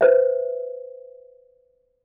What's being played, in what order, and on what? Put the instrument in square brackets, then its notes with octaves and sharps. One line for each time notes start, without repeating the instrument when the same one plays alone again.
[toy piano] B4 C5 E5